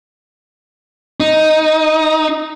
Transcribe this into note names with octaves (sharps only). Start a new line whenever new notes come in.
D#4